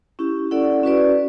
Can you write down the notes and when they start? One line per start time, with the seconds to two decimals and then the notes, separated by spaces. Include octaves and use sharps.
0.19 C#4 E4 G4
0.51 C#4 E4 A4 D5 F#5
0.83 C#4 F#4 B4 D5